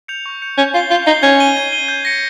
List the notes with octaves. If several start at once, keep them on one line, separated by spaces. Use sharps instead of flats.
G6 C#7 F7
C#6
G6 C#7 F7
C#4 G6
F4 C7 G7
F4 G6
D#4 C7 G7
C#4 G#6
D#7 G7
G#6
D#7 G7
G6
A#6 C#7